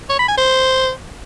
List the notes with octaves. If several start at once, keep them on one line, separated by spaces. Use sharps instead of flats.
C#5
B5
G#5
C5